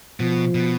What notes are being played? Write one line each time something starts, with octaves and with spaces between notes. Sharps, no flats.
B2 F3
B2